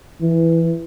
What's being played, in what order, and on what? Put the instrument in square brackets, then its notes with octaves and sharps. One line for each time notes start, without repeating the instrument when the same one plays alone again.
[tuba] E3